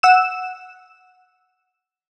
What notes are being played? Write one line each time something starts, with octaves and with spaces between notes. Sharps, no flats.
F#5 E6 E7